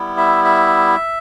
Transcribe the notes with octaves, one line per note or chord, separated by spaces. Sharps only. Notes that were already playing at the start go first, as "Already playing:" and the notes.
Already playing: G3 B3 E4
E5
E5